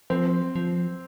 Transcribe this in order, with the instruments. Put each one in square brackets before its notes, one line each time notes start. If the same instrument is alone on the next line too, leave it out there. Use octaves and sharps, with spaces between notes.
[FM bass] F3 [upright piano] C4
[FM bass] F3